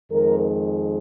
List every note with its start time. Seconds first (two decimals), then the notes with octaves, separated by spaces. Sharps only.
0.11 F2 D#3 G#3 A#4